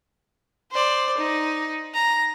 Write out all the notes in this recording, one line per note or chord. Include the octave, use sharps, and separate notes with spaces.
C5 D5
D#4
A#5